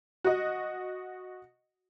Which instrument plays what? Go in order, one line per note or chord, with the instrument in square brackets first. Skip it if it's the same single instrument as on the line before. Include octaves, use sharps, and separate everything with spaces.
[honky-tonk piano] F#4 D#5